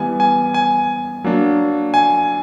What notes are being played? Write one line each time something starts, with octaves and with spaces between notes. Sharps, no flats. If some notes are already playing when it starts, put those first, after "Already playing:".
Already playing: E3 G3 B3 G#5
G#5
G#5
F#3 A#3 D4
G#5